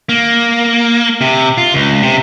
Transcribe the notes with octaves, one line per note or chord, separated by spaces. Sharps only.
A#3
C3
F4
C#2
C3